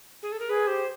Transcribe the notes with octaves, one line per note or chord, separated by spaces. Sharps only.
G#4
A4
A#4
G#4 B4
G4 C5